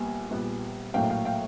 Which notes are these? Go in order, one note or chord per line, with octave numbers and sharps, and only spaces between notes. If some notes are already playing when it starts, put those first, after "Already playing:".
Already playing: A#1 A#2 G3 B3 G#5
A#1 A#2 G3 B3
A#1 A2 F#3 A#3 F5 G5
F5 G5
F5 G5